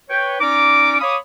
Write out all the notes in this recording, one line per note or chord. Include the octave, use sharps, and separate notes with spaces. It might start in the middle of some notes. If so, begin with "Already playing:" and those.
B4 C#5 G5
C#4 D#4 D5 A#5 D6
C#5 F5 B5 D6 D#6